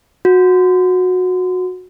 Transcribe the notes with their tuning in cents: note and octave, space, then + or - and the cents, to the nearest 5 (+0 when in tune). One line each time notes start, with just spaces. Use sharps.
F#4 -15